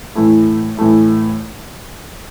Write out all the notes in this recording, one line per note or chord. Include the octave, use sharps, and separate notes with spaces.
A2 E3 A3 E4
A2 E3 A3 E4